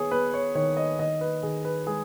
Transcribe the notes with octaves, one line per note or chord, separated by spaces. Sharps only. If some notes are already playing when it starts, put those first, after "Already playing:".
Already playing: D#3 B3 G#4 C#5
B3 B4
C#5
D#3 C#5
D#5
D#3 D#5
B4
D#3 G#4
B4
G#3 G#4